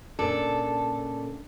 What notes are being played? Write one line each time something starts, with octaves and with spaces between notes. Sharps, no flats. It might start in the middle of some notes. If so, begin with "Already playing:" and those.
A#2 C#3 D4 A4